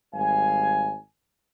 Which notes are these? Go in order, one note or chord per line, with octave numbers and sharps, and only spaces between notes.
G#1 G3 F5 G#5